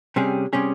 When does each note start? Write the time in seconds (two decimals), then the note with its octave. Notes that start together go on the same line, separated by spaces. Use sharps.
0.16 C3 G3 C#4 G#4
0.53 C3 G3 C#4 G#4